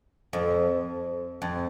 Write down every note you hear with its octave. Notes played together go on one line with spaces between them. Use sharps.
F2
F2